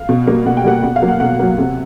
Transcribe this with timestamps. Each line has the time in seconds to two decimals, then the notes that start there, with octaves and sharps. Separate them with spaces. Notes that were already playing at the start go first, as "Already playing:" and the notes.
Already playing: F5
0.09 B2
0.26 G3 A#3
0.46 B2 F#5
0.57 G5
0.64 G3 A#3 F#5
0.83 B2 F#5
0.96 F5
1.02 F#3 A#3
1.08 F#5
1.20 B2 F#5
1.39 F#3 A#3
1.58 C3